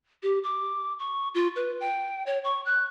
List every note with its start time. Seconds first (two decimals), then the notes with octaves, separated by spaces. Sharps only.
0.23 G4
0.44 D6
0.99 C#6
1.35 F4
1.56 B4
1.80 G5
2.26 C#5
2.44 C#6
2.66 F#6